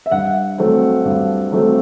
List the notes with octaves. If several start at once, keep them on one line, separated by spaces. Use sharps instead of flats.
E5
G2 F#5
F#3 A3 C4
G2
F#3 A3 C4